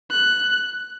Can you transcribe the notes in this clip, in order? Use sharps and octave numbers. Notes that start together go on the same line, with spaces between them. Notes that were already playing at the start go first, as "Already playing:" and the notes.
F#6